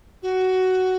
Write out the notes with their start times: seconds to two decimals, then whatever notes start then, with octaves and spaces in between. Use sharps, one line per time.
0.23 F#4